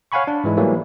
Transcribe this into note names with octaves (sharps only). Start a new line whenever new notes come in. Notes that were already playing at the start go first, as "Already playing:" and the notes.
C#5 F5 F#5 G#5 B5 C#6
D4
G#2 E3 G#3 E4
E3 F#3 G3 A3 A#3